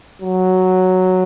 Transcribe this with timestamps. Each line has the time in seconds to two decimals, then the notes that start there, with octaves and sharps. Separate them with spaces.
0.22 F#3